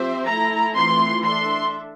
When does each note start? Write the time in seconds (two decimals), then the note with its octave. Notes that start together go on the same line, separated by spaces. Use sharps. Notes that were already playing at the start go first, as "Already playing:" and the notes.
Already playing: F3 C4 G4 C5 E5
0.27 A3 E4 A4 A#5
0.75 E3 A3 C4 F4 C6
1.23 D4 A4 E5 C6